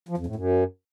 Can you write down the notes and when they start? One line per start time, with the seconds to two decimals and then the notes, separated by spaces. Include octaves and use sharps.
0.09 F3
0.18 F2
0.27 A2
0.36 F#2